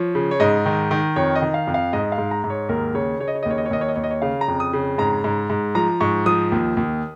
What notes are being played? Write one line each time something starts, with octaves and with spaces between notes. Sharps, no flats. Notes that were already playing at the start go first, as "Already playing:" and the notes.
Already playing: F3 C#5
C#3
C#5
G#2 D#5
D#3
D#3
F2 C#5
D#5
D#3
F5
F2
F5
G#2 D#5
F5
G#2
A#5
G#2
C#5
D#2 A#4
C#3 C#5
C#3 C#5
D#5
C#5
D#5
D#2 C#5
D#5
C#5
D#2 D#5
C#5
D#5
D#2 C#5
D#5
C#5
C#3 F5
A#5
F2
D#6
C#3
G#2 A#5
G#2
G#2
F3 A#5
G#2 C#6
F3 D#6
D#2
D#2